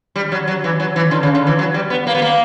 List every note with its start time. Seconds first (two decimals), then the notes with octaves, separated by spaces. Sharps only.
0.16 G3
0.32 F#3
0.48 F#3
0.64 E3
0.80 F#3
0.96 E3
1.11 D3
1.23 C#3
1.35 D3
1.47 E3
1.59 F#3
1.74 G3
1.90 B3
2.07 A#3
2.15 B3
2.22 A#3